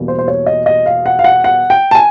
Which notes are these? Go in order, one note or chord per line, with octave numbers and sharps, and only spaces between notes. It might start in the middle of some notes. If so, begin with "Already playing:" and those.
Already playing: E2 B2 G3 A#3
C5
C5
C#5
D#5
D#5
F5
F#5
F5
F#5
F#5
G5
A5
G#5